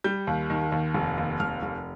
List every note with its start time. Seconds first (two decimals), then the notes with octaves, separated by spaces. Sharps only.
0.04 G3 G6
0.27 D#2
0.50 D#3
0.72 D#2
0.94 F1
1.18 D#2
1.40 F1 F6
1.63 F1